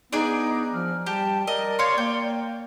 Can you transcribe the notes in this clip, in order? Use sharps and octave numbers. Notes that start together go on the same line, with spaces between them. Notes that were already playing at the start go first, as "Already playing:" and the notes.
B3 D4 D#4 G#4 D5
F3 F6
G3 G4 A5
A#4 D5 D#5
C#5 F5 C6
A#3 G5